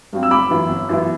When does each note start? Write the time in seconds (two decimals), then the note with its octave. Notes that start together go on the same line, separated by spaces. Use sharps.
0.13 G2 F#3 C4
0.23 E6
0.31 G1 B5 D6
0.50 F#2 E3 B3 E4
0.69 G1
0.89 F#2 E3 B3 E4